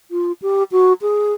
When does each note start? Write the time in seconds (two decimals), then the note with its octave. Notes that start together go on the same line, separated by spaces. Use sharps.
0.11 F4
0.42 G4
0.72 F#4
1.02 G#4